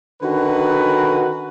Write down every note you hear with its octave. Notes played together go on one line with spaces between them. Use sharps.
D3 D#3 C#4 F#4 B4